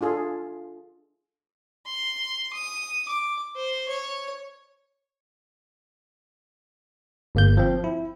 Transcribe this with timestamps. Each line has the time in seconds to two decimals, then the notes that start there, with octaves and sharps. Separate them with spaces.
0.01 D4 F4 G#4 A4
1.86 C6
2.53 D#6
3.08 D6
3.56 C5
3.88 C#5
7.35 G1 A#3 G6
7.57 F3 C4
7.84 E4